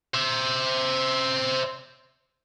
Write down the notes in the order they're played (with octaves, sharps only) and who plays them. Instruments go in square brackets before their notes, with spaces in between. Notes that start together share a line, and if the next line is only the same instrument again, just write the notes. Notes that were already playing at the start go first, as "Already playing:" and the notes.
[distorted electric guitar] C5 E5